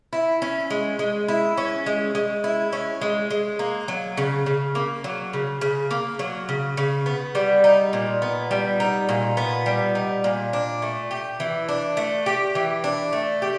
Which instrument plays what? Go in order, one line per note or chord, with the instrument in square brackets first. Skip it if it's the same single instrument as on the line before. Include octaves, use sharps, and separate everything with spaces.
[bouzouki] E4
C#4
G#3
G#3
E4
C#4
G#3
G#3
E4
C#4
G#3
G#3
A#3
F#3
C#3
C#3
A#3
F#3
C#3
C#3
A#3
F#3
C#3
C#3
B3
G3
D#4
A#2
B3
G3
D#4
A#2
B3
G3
D#4
A#2
D4
A3
G4
E3
D4
A3
G4
E3
D4
A3
G4